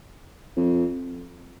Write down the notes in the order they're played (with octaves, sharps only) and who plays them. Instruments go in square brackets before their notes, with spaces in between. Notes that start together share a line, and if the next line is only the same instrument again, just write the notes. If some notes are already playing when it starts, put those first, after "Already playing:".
[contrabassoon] F2